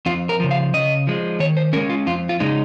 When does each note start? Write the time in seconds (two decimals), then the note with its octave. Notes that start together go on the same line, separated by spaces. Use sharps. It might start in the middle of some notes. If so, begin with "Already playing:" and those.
0.06 F2 F4
0.29 A#4
0.40 C#3 F3
0.51 F5
0.74 C#3 D#5
1.07 F3 G#3
1.40 D#3 C#5
1.57 C5
1.73 G#3 C#4 A#4
1.90 F4
2.06 F2 F4
2.29 F4
2.40 C#3 G#3 D#4